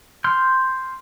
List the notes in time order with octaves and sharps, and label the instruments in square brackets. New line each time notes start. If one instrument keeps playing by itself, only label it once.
[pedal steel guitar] C6 F6 G6